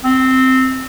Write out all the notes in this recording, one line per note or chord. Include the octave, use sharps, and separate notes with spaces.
C4